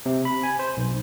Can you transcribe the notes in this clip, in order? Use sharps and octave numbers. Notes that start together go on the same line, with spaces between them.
C3
B5
G#5
C5
B1